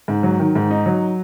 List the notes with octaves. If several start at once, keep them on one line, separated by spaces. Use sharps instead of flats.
G#2
F#3
D#3
G#2
D#4
F#3